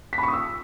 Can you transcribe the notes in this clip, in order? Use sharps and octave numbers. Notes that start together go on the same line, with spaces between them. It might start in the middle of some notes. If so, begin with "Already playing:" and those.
B6
B5
C#6
D#6
E6